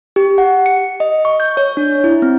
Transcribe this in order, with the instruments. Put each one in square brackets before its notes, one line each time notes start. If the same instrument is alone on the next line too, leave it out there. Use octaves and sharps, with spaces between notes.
[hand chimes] G4
F#5
C#7
D#5
C#6
G6
C#5
D4
E4
C4